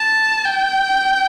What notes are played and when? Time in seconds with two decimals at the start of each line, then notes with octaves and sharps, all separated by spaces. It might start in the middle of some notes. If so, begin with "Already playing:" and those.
Already playing: A5
0.45 G5